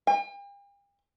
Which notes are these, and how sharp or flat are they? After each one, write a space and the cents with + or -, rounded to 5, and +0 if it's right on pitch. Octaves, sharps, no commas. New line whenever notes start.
G5 +45